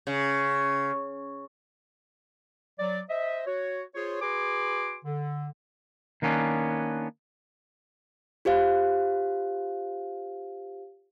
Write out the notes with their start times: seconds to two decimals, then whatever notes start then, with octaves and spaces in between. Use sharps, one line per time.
0.07 C#3
2.78 F#3 D5
3.09 C5 D#5 E5
3.46 F#4 C#5
3.95 F4 G#4 C5 C#5
4.21 F#4 G#4 B4 G#5 C6 D6
5.05 D3
6.22 D#3 A#3 B3 C#4 D4
8.45 F4 G4 C5 F5